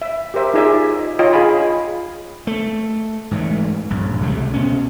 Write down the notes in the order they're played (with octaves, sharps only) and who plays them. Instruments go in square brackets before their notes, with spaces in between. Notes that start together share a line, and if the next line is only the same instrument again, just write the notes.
[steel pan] E5
G4 A#4 C5 E5
D#4 F4 G#4 D5 E5
D#5
F4 C#5 D#5 G5
D4 G#4 D#5 F5 G#5 B5
[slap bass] A3
G#2 E3 F3 A3
A#1 G2
C#2 C3 G3 A3
B2 C#4